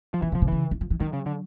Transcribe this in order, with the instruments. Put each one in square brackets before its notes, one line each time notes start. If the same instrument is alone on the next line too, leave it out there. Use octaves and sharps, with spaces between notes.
[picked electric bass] F3
[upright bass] A#2 [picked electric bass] E3
[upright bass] B2 [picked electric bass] F3
[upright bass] C3
[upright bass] C#3 [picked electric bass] E3
[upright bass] E3
F3
E3
[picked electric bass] D#3 [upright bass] F#3
[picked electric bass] C#3
D3